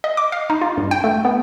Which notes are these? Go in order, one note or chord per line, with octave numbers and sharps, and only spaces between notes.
D#5
D6
F5
D#4
F4
G2
G5
A3
B3